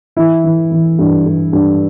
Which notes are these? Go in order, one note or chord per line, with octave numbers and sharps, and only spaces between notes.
E3 E4
E3
E3
G2
G2
G2